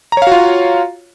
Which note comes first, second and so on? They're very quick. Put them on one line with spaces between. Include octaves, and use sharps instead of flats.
A#5 C#5 F5 F#4 F4